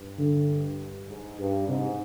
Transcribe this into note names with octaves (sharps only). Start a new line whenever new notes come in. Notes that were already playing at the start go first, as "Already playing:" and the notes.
Already playing: G2
D3
G#2
G2
G#2 C3